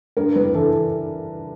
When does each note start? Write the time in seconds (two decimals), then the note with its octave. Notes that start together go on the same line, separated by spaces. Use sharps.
0.17 G2 A#4
0.35 G3 B4
0.54 E3 A4